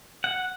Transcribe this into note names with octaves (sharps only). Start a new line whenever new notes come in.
F#5